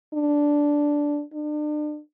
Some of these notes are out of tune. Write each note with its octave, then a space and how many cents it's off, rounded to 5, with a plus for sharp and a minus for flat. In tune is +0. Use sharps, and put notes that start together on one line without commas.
D4 -5
D4 +35